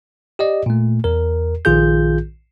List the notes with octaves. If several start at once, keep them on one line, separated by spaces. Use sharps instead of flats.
G4 D5 D#5
A#2 A3
E2 A#4
A#1 D#3 F4 G#4 G6